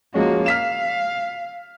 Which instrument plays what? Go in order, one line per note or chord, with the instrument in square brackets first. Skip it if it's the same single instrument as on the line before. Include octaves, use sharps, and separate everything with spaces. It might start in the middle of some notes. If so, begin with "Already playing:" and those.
[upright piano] F3 G#3 C#4 [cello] A#3 F#4
[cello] F5 [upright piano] F6 B6 E7